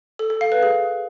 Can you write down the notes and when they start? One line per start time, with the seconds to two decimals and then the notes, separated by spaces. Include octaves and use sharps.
0.19 A4
0.30 A4
0.41 F5
0.52 B4
0.63 G#4